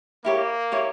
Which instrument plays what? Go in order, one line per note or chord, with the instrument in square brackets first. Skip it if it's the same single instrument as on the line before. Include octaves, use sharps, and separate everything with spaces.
[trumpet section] A#3 [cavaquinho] E4 G4 C#5
[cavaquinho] E4 G4 C#5